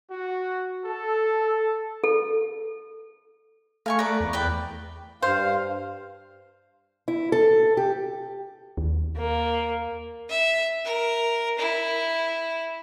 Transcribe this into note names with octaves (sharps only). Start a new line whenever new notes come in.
F#4
A4
A4
A3 F5 G#5 C#6
A#4 B4 D5
E2
B4 D5 G5
G2 C5 F5
E4
A4
G4
D#2
A#3
E5
A#4
E4